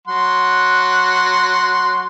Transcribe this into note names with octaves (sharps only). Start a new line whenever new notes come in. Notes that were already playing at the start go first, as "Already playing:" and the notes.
F#3 F#5 C6